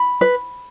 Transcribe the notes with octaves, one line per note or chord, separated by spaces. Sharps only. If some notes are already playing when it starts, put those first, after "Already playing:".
Already playing: B5
B4